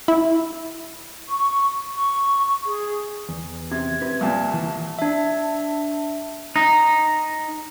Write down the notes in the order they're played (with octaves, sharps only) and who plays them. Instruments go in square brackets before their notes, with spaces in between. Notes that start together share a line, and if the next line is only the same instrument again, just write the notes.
[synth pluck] E4
[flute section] C#6
[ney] C#6
G#4
[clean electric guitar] E2
[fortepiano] C3 [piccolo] G#6
[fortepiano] C3 [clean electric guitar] B4
[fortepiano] C2 A#2 [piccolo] A5
[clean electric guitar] E3
[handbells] D4 E5
[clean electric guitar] D#4